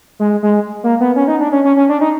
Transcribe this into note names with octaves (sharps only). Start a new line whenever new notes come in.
G#3
G#3
A#3
B3
C#4
D#4
D4
C#4
C#4
C#4
D4
D#4